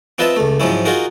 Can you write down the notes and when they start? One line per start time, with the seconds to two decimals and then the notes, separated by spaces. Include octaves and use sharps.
0.18 C4 F4 B4 D#5 E5 A5
0.36 C#2 A3
0.60 G#2 F3 F#3 C#4 E4
0.85 D#4 F4 F#4 G#4 A#4